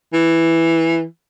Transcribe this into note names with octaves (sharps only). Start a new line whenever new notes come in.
E3